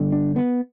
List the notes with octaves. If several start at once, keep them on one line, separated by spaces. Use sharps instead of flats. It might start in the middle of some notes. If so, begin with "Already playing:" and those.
Already playing: G1 G2 D3
D4
B3